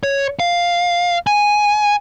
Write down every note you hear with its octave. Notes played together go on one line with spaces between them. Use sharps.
C#5
F5
G#5